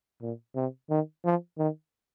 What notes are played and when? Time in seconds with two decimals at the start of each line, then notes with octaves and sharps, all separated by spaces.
0.22 A#2
0.56 C3
0.90 D#3
1.24 F3
1.58 D#3